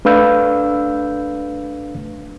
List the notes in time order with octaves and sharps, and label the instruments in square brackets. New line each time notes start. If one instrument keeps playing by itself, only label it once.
[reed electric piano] A3 D4 B4 F5 E6 G6